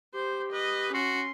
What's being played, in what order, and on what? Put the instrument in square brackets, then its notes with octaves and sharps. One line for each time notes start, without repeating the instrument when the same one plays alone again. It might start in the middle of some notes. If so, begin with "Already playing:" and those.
[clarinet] G4 [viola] C5
[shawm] B4 [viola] D#5
[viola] C#4 [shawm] F#4 [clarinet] C6